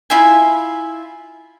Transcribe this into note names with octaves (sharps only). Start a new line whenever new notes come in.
E4 F4 E5 G#5